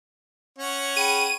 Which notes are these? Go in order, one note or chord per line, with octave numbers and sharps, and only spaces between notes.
C#4 C#5 F#5
G#4 G5 B5 D#7